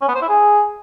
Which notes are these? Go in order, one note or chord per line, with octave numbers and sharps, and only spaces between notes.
C#4
B3
C5
E4
G#4